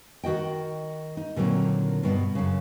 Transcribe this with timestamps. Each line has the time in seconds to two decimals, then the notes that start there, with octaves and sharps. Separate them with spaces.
0.23 D#3 F#4 D#5 G5
1.17 D#4
1.36 A#2 D3 D#3 F#3 A#3 C4
2.03 G2 B2
2.35 F#2 C#3